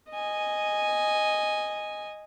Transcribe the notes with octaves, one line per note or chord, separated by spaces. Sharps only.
D#5 G#5